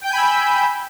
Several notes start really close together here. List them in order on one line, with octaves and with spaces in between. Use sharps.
G5 G6 G#5 B5 E6